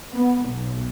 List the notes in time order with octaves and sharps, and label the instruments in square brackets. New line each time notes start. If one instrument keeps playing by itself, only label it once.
[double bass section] B3
B1